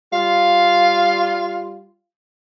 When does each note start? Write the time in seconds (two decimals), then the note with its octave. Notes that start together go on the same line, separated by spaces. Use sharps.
0.13 G3 F4 F5